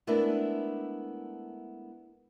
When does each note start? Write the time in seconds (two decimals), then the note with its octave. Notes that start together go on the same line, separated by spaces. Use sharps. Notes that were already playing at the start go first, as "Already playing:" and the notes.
0.07 G#3 A3 B3 D4 E4 A#4